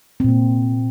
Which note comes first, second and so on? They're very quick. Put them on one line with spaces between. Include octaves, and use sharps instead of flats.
C4 A#2 A#3